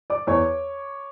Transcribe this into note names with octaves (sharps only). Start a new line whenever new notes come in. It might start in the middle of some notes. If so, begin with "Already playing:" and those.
D5 D6
E2 C#5 C#6